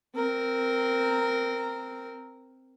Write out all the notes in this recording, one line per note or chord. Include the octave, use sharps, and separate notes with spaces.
C4 A#4